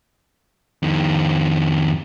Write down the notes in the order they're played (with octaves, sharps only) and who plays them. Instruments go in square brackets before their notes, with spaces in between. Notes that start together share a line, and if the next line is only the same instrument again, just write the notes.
[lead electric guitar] F2 D#3